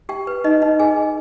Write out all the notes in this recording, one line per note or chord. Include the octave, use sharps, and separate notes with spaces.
G4 G5
B4
D#4 D#5
D#4 D#5
G#4 G#5